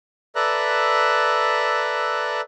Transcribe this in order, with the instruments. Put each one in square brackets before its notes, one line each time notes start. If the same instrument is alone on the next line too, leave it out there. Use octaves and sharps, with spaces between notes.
[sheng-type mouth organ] A4 B4 D5 E5 A#5 F#6